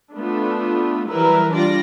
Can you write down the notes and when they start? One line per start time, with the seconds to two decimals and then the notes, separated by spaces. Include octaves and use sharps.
0.15 A3 B3 D4 F4
1.09 E3 F#3 G3 E4 A#4 B4
1.52 G3 D4 F4 D5 A#6